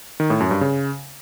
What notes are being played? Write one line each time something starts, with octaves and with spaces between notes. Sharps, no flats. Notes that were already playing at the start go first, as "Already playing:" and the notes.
D#3
A2
F#2
G2
C#3